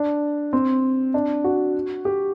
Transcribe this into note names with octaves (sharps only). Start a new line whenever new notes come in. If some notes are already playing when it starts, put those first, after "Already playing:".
Already playing: D4
C4
D4
F#4
G4